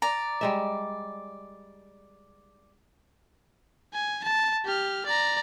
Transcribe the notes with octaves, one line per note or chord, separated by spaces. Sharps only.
D5 A#5
G3 G#3 E5
G#5
A5
G4 F6
D5 A#5